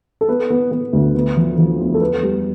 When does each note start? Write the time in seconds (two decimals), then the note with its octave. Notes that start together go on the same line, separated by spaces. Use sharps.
0.21 A4
0.28 B3 B4
0.50 B3
0.71 B3
0.93 D2
1.15 B3
1.37 F3
1.58 F3
1.80 E2
1.94 A4
2.00 B3 B4
2.23 G3